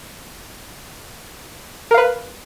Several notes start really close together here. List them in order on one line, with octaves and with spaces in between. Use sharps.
A#4 F5 B4